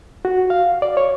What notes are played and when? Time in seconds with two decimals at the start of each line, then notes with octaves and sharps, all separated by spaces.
0.25 F#4
0.50 F5
0.82 D5
0.97 C#5